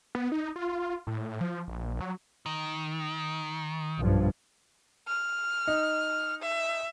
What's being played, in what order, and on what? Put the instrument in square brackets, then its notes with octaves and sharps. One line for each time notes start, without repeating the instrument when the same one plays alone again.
[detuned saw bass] B3
D#4
F4
A2
F3
A#1
F#3
[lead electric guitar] D#3
[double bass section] B1 G2 F3
[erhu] F6
[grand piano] D#4
[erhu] E5